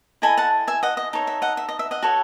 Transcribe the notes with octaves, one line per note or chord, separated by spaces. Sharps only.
E4 A4 D#5 G#5 B5
F#5 A5
E5 G#5
D#5 F#5
D#5
D#4 A4 C#5
E5
D#5 F#5
E5
D#5
E5
D#5 F#5
F#4 A4 C#5